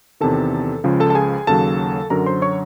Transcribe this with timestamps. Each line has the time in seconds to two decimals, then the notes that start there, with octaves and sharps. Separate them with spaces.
0.20 E2 C3 D#3 A4 A5
0.84 C#2 C#3 F3
1.00 A4 A5
1.10 A5
1.15 G#4 G#5
1.47 D#2 C#3 F#3 A4 A5
2.10 F#2 D3 F#3 A#4 A#5
2.26 C5 C6
2.42 C#5 C#6